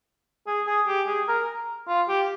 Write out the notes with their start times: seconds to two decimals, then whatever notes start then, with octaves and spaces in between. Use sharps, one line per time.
0.47 G#4
0.67 G#4
0.87 G4
1.07 G#4
1.28 A#4
1.88 F4
2.09 G4